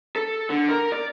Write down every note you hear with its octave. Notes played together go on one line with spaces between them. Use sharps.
A4
D3
A#4
D5